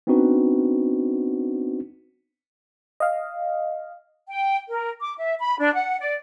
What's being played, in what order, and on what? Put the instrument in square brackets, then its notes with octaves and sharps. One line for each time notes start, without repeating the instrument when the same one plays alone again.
[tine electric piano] B3 C4 D4 D#4 F#4 B4
[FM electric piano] D#5 F5
[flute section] G5
A#4
D6
E5
B5
D4
F#5
D5